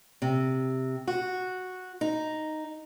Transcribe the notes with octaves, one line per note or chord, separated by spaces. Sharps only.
C3
F#4
D#4